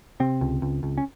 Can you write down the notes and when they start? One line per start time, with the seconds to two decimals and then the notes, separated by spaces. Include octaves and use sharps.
0.20 C3 C4
0.41 C#2
0.62 C#2
0.83 C#2
0.98 C#4